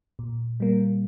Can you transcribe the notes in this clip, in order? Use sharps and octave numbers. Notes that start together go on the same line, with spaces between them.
A#2
G3 A#3